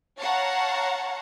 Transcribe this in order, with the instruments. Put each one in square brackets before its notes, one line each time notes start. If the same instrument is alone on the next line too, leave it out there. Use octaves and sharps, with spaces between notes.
[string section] C#5 F5 F#5 A5 A#5 C#6